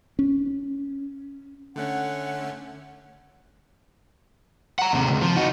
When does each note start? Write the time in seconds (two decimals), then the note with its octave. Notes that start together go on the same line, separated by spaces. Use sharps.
0.19 C#4
1.76 D3 A3 C#4 F#5
4.79 F#5 A#5
4.93 D#2 C3
5.09 C#2
5.22 F3
5.36 D#4 F#4